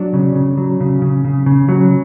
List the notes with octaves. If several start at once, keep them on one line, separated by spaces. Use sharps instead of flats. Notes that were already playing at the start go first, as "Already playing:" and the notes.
Already playing: F#3 D4
C#3
C#3
F#3
C#3
C#3
C#3
C#3
F#3